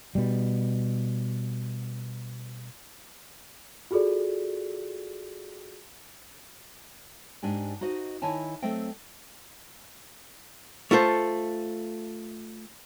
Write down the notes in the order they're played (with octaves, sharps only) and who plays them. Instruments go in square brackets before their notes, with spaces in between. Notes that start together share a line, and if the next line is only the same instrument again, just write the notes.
[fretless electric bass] B2 G3
[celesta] F4 F#4 G#4 A4 D5
[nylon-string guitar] G#2 D4 G4 G#5
D#4 F#4 C5 D#5
D#3 E4 C#5 G#5 A5
F#3 A3 C4 C5 D#5 G5
[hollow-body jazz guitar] A3 F4 A4 C5